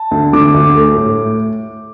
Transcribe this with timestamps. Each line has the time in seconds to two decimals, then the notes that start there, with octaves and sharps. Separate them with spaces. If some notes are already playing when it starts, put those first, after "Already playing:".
Already playing: A5
0.11 D2
0.33 D3 D6
0.54 D2
0.75 A3
0.96 A2